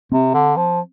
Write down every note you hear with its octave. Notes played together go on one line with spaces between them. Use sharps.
C3 C4
D3
F3